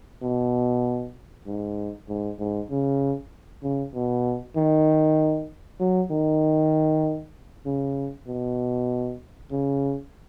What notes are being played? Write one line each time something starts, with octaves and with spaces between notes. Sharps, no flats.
B2
G#2
G#2
G#2
C#3
C#3
B2
D#3
F#3
D#3
C#3
B2
C#3